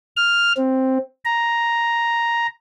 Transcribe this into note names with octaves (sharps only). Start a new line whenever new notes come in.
F6
C4
A#5